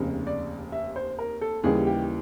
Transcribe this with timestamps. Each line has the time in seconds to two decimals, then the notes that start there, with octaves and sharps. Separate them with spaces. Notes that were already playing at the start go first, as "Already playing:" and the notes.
Already playing: F1 D#2 C#3
0.27 D5
0.72 E5
0.96 C5
1.19 A#4
1.41 A4
1.63 D#2 C#3 E3 G3 G#4
1.87 G4